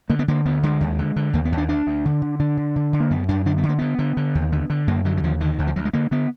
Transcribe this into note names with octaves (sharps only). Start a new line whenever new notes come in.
D3 A#3
B3
D3 A#3
D2 B3
D3 G#3
D#2
D3
D3
D#2 A#3
B3
D#2
D4
D2 D4
D2
D3
D3
D3 D4
D3
D3
D3
A#3
F#2 B3
F#2 D4
D3 D4
B3
D3
A#3
D3 B3
D3
D3
D#2
D3
D3
F#2 A#3
D3 F#3
F#3
D#2 F3
D3 D#3
D2 D3
F3
D2 F#3
G#3
D3 A#3
D3 B3